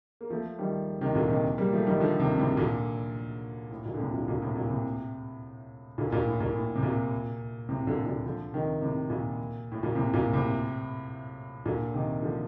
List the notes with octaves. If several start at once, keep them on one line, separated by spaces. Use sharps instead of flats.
A#3
F3 A3
D#3 G3
C3 D#3
A#2 D3
C3 D#3
G3 A#3
F3 A3
D#3 G3
D3 F3
C3 D#3
A2 C3
A#2 D3
A2
A#2
D3
A2 C3
A#2 D3
A#2 D3
A2 C3
A#2
A2 C3
A#2 D3
A#2
A2
A#2
A2
C3
A#2
A2 C3
A#2 D3
A#2 D3
D3 F3
C3 D#3
A2 C3
A#2
A2
A#2
A2 C3
A#2
A2 C3
A#2 D3
C3 D#3
D3 F3